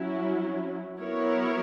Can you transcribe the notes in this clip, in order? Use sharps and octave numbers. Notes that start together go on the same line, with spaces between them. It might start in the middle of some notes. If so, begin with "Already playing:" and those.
Already playing: F#3 C#4 E4
F#3 B3 E4 A#4 C#5